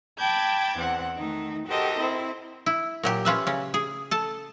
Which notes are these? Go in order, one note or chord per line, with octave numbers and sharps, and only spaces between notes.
G5 A5 B5 D6 G6 G#6
E2 C4 F#5
D#3 A3 D#4
F#4 G4 A4 A#4 C5 D#5
C4 E4
E4
A#2 F#3 G4
C#4 F4 B4 E5
C#3 C#4
G#4
A4 A5